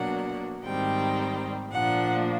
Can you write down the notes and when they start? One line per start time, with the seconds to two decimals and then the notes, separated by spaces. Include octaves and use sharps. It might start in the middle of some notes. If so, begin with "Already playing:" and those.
Already playing: B2 F#3 A#3 D4 F#5
0.64 G#2 D#3 G3 C4 G5
1.71 A#2 F3 A#3 D4 F#5